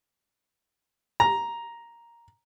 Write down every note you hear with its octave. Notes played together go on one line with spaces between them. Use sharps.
A#5